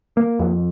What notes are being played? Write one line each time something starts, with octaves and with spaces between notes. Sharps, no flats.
A#3
F2